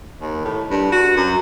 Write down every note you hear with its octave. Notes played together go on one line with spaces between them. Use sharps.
D#2
A2
G2
F#4
F#2